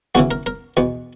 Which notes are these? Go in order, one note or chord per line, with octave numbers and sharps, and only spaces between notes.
E2 C#3 E3 F#4
A#4
A#4
E2 B2